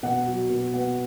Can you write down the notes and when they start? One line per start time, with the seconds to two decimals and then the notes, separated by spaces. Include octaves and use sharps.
0.03 B2 F#5
0.26 F#3
0.50 B2
0.73 B3 F#5